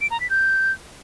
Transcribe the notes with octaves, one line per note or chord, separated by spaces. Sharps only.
D7
A#5
B6
G6